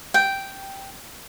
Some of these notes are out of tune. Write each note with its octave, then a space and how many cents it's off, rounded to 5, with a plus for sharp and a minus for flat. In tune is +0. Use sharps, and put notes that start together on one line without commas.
G5 -5